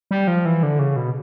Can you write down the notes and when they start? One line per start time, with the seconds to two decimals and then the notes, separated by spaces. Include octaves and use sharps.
0.11 G3
0.27 F3
0.45 E3
0.63 D3
0.79 C#3
0.96 B2